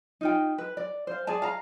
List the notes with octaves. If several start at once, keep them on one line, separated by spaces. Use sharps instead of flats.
D#4 F4 G5
B4
D5
C5 F5
G#4 D5 A5
F5 A#5